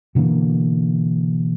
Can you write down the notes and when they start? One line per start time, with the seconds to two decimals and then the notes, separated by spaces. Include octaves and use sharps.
0.15 B2 D3 E3 A#3